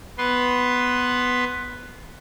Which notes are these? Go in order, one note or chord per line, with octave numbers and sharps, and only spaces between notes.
B3 B4 C6